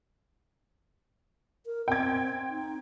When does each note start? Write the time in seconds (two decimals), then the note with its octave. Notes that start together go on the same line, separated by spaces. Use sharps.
1.66 A#4
1.88 C4 G5 G#6
2.49 D#4